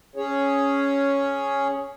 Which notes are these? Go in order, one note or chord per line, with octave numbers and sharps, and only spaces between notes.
C#4 G#4 C#5